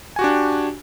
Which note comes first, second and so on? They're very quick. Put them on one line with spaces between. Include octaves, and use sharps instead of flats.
G#5 F#4 G4 D4